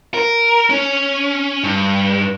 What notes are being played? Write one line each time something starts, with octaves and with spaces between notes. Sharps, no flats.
A#4
C#4
G2